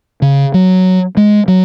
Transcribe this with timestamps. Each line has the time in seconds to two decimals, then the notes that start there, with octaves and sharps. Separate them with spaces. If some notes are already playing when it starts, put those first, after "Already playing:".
0.22 C#3
0.54 F#3
1.17 G#3
1.48 F#3